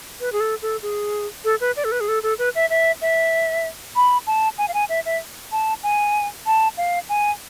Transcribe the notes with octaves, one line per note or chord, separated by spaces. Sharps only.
B4
G#4
A4
A4
G#4
A4
B4
D5
A4
B4
G#4
A4
A4
B4
E5
E5
E5
B5
A5
G#5
F5
G#5
E5
E5
A5
G#5
A5
F5
G#5